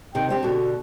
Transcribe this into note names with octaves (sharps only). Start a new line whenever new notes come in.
C3 D#3 G5
D2 C4 G4 C5
B2 D3 F#4